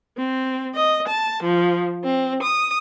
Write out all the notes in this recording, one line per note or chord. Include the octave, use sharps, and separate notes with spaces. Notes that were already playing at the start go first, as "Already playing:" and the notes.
C4
D#5
A5
F3
C4
D#6